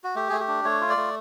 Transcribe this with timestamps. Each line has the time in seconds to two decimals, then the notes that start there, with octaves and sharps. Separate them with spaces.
0.04 F#4
0.16 A3 G4
0.29 A3 G#4
0.40 G4
0.48 D4
0.65 A3 C#5
0.81 F4
0.89 D5
0.97 A3